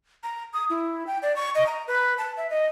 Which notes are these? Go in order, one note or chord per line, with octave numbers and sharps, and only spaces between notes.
A#5
D#6
E4
G5
D5
C#6
D#5
A#5
B4
A5
E5
D#5